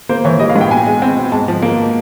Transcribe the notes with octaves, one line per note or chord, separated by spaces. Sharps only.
A#3 C5
E3 C#5
G3 D#5
F5
A2
G5
B2 G#5
G#3
C4
B2
G#2 A5
F3
A#3